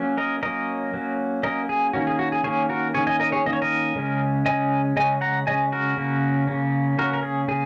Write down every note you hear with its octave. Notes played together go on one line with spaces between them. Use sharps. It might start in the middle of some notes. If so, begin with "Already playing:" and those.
Already playing: F#3 A#3 C#4
A#4 D#5
F#3 A#3 C#4 A#4 D#5
F#3 A#3 C#4
F#3 A#3 C#4 A#4 D#5
G#4
D#3 A#3 C#4 F#4
G#4
F#4
G#4
D#3 A#3 C#4 G#4 C#5
F#4 A#4
D#3 A#3 C#4 G#4 C#5
D#5 G#5
A#4 D#5
G#4 C#5
D#3 A#3 C#4 D#5
C#5
A#4 D#5
C#3 G#3 C#4
C#3 G#3 C#4 D#5 G#5
C#3 G#3 C#4 D#5 G#5
F#5 A#5
C#3 G#3 C#4 D#5 G#5
F#4 A#4
C#3 A#3 C#4
C#3 A#3 C#4
C#3 A#3 C#4 F#4 A#4
A#4
G#4
C#3 A#3 G#4